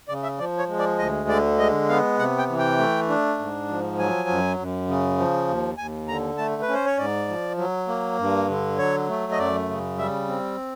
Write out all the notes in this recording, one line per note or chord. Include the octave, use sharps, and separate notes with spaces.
C#3 D5
E5
F3 D5
C#5
G#3
D5
D2 D#5
D3 D5
G#3 D#5
B3 F5
C3 F#5
G5
E3
G5
A3
D4
G#2
F3
F#3 G#5
F#2
F#2
C#3
F3
D#2
D#2 G#5
D3 A#5
A3 A5
B4
C#4
C5
C#5
G#2 D5
F3
F#3
A#3
G2
D3
F#3 C#5
A3
D#5
F#2 D5
C#3
G3 E5
C4